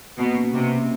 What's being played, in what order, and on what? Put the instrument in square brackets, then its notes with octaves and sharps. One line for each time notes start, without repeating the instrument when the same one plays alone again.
[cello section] B2 [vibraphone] A#3
[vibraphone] C#4
[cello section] C3 [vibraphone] C#4
[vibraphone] C#4